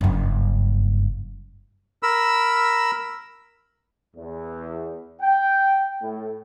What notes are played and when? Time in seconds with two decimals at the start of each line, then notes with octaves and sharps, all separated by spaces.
0.01 F#1 G2
2.03 A#4 B5 E6
4.16 E2
5.22 G5
6.02 A2